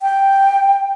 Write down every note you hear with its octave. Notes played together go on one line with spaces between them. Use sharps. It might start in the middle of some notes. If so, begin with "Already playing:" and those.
G5